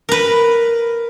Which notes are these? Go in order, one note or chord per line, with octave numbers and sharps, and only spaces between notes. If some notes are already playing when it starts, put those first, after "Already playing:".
A#4 B4